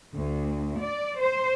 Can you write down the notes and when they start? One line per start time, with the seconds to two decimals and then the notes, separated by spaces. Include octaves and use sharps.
0.16 D2
0.81 D5
1.22 C5